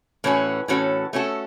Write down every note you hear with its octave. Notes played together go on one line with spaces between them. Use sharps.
A2 E3 C#4 F#4
A2 E3 C#4 F#4 A4
A3 C#4 F#4 A4